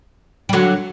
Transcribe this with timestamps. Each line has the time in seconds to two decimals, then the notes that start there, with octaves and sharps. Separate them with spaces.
0.49 G3
0.53 D3 F#3